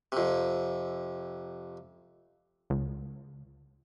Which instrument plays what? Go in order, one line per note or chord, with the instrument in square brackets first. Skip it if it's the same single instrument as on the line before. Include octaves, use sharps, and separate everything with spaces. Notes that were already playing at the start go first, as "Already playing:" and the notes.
[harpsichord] F2 C3
[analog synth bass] C#2